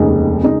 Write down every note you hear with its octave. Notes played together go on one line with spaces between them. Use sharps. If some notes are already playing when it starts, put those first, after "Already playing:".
Already playing: F1 D#2 C#3 G#3 D#4
C#3 G#3 D#4